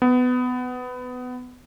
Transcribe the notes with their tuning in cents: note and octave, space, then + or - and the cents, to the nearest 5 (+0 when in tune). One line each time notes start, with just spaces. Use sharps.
B3 +20